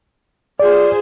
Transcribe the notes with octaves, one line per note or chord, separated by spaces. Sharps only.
F4 G#4 C5 D5